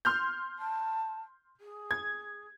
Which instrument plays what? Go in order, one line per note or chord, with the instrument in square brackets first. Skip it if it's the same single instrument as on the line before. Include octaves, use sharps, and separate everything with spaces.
[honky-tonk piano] C6 F6 G6
[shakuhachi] A5
G#4
[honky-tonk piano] G#6